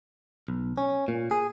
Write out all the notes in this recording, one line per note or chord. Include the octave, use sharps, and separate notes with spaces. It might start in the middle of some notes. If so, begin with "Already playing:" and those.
B1
C#4
A#2
G#4